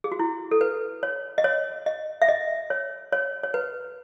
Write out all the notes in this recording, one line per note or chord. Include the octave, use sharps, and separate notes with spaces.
G#4
F#4
E4
A4
B4
C#5
D#5
C#5
D#5
E5
D#5
C#5
C#5
C#5
B4